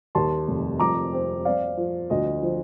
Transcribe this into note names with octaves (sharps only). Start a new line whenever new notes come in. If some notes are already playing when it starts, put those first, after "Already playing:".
D#2 A5 C6
F1
F2 A#5 D6
C4
C4 D5 F5
F3
D2 D#5
F3